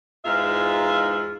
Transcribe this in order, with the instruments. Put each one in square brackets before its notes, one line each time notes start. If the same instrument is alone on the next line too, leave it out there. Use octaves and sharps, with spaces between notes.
[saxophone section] E2 G#2 D#4 F4 E5 F5